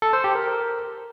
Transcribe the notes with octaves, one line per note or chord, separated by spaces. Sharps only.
A4
C5
G4
A#4